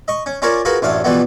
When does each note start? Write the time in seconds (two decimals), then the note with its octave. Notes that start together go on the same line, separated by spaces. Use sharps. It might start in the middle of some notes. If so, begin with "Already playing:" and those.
0.08 D#5 C#6
0.26 C#4
0.42 C#4 F4 A#4 C#5 D5 G#5
0.65 F4 F#4 G#4 A#4 B4
0.82 A1 F#2 A3 D4 F5
1.04 B2 E3 F3 G3 A3 B3